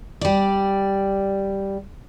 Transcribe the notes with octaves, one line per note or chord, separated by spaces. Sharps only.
G3 D5